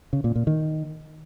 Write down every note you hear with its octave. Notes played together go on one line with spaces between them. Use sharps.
C#3
A#2
A#2
D#3